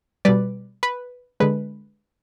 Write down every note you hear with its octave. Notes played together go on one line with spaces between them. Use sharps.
B2 G3 B4 D5
B4
D3 G#3 B4